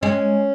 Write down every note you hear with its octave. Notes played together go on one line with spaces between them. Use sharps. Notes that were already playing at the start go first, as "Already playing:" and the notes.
G#3 C#4